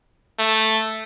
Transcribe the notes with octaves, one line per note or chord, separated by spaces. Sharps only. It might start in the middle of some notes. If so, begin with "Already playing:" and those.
A3